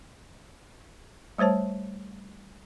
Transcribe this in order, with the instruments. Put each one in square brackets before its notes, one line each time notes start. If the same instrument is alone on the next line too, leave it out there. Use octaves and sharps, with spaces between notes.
[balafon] G3 A3 C5 C#5 A5